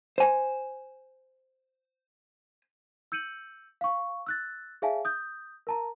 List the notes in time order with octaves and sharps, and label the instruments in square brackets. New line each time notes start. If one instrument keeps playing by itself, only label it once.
[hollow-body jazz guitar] C5 G#5
[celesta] E6 G6 C#7 D#7 F#7
F5 C#6
E6 F#6 A6
G#4 C#5 E5 F5 G#5 A5
D#6 G6
A#4 A5 A#5